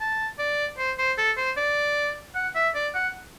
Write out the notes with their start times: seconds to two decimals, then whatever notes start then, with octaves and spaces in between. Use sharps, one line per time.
0.01 A5
0.39 D5
0.78 C5
0.99 C5
1.18 A4
1.37 C5
1.57 D5
2.35 F#5
2.55 E5
2.75 D5
2.95 F#5